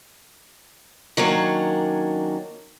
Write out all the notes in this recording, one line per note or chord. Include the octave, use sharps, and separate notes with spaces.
D#3 F#3 A#3 C#4 D4